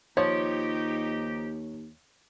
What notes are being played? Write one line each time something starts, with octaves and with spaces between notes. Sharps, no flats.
D#2 F3 D#4 G4 C#5